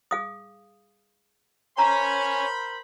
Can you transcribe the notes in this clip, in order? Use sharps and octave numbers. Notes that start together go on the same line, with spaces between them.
G#4 F5 D#6
A#4 C5 C#5 G#5 A#5 B5